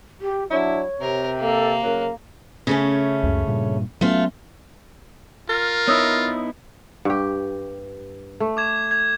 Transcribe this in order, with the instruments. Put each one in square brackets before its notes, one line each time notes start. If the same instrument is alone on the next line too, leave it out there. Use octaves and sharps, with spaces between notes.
[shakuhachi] G4
[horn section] F#3 D4 E4 [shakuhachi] C#5
[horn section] C3 [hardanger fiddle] A#4
[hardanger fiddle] A#3 [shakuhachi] A4
[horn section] F#2 C#3 F#3 [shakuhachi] A#4
[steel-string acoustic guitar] C#3 A3 C#4
[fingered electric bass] C#2 F#2
G2 A#2
[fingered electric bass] F#3 B3 C#4 [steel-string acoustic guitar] A3 F4
[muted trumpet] F4 [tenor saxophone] A#4
[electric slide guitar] B3 D#4 E4 [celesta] C#5 D#6 E6
[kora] G2 G4
A3
[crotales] D6 G#6 E7
G#6